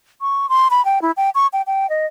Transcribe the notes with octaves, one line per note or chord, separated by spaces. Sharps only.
C#6
C6
B5
G5
E4
G5
C#6
G5
G5
D#5